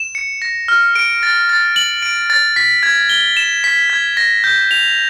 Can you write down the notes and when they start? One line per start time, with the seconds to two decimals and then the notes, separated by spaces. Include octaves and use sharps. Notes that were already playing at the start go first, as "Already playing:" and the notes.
Already playing: E7
0.15 C#7
0.42 A#6
0.68 F6
0.95 D7
1.23 A6
1.49 A6
1.76 F#7
2.02 D7
2.30 A6
2.56 B6
2.83 G#6
3.09 G7
3.37 E7
3.64 B6
3.90 G#6
4.17 A#6
4.44 G6
4.71 F7